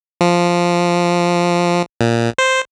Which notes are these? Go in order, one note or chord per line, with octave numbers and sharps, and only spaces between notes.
F3
A#2
C5